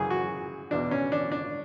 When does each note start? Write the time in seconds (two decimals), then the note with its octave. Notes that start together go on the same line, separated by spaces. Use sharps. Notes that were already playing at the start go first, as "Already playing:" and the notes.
Already playing: F#2 C#3 E3 G#4
0.10 F#4
0.71 E2 B2 D4
0.91 C#4
1.12 D4
1.32 D4